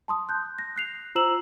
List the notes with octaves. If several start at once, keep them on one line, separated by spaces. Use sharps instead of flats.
A5 C6 D#6
F#6 G6
A#6
F#6 C7 F7
F4 C5 A#5 E6 E7 F#7